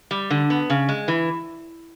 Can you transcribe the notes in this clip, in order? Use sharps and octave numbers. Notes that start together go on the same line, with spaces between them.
G3
D3
B3
C#3
G#3
E3